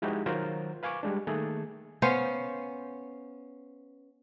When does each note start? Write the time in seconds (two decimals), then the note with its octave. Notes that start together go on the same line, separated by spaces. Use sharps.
0.02 F3 G#3 D#4 E4 F#4 G4
0.26 D#3 F#3 F4 F#4 A#4 C5
0.83 B4 F5 G#5 C#6 D6
1.03 G3 G#3 D4
1.27 D#3 A3 A#3 G#4 A4
2.02 B3 C#4 C5 F5